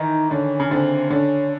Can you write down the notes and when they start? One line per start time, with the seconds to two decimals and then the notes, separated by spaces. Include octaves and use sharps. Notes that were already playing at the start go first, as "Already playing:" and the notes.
Already playing: D#3 E3 D#4
0.31 D3 C#4
0.60 C#3
0.71 D3 C4
1.10 D3 C#4